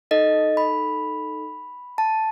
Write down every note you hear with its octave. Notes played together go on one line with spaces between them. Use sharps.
D#4 A4 D#5
B5
A5